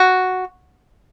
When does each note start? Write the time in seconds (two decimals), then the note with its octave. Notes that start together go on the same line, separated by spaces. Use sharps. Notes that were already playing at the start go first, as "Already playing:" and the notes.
Already playing: F#4